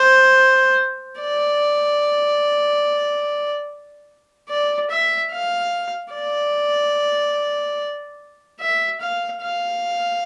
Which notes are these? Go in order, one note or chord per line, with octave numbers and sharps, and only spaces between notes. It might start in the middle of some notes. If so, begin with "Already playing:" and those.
Already playing: C5
D5
D5
E5
F5
D5
E5
F5
F5